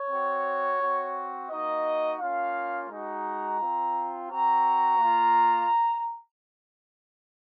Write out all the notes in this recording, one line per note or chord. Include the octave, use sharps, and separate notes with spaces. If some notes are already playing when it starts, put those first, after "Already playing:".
Already playing: C#5
C4 F#4
C4 F#4
A#3 D#4 F#4 D#5
A#3 C#4 F4 F5
G#3 D#4 F#4 A#5
C4 F4
C4 F#4 A#5
A#3 F4